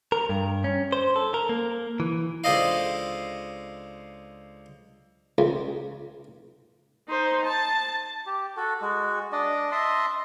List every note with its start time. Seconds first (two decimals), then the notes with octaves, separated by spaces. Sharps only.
0.12 A#4
0.29 G2
0.64 C#4
0.92 C5
1.16 A4
1.34 A#4
1.49 A#3
2.00 E3
2.44 C#2 D4 A4 C5 D#5 F5
5.38 C#2
7.08 D#4 C5
7.45 A5
8.26 G4
8.57 F#4 A4
8.82 G#3 F#4
9.32 D4 D5 D#5
9.72 D#5 E5 A5 C6